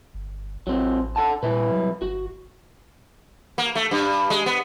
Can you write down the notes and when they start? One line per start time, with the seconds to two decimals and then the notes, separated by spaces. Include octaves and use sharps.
0.15 G1
0.67 A1 F#3 C4
1.16 A4 F#5 A5
1.43 C2 A#2 E4 B4
1.72 F#3
2.02 G1 F#4
3.58 A#3
3.75 A3
3.91 G2
4.30 G#3
4.46 B3